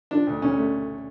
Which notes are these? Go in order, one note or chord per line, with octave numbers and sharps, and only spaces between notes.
F3 D4
D2
D2 C#4
A3